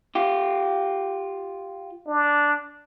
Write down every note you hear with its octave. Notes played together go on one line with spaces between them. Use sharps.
F4 G4
D4